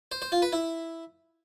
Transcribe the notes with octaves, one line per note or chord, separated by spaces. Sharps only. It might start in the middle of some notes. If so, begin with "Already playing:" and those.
C5
C5
F4
B4
E4